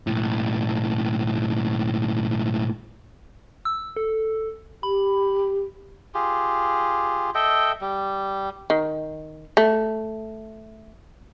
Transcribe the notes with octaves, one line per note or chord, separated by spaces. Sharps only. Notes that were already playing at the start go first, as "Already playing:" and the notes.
B1 A2
E6
A4
G4 B5
F4 G4 G#4
A4 D#5 E5 G5
G3
D#3
A3